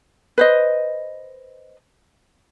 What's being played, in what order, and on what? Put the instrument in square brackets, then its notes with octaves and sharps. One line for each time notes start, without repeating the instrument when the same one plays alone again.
[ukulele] B4 C5 D#5